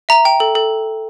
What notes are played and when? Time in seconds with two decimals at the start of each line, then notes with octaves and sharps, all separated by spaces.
0.09 E5 A#5
0.25 G5
0.40 A4
0.55 A4